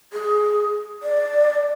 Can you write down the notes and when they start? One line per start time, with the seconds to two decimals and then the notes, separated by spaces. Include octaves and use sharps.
0.13 G#4
1.03 D5